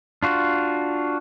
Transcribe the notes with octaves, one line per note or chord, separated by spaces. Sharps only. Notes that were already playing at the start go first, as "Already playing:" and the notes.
D4 F4 F#4